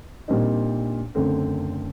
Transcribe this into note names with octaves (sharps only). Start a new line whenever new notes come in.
A#1 A#2 G3 C4 D#4
F#1 F#2 D3 A3 C4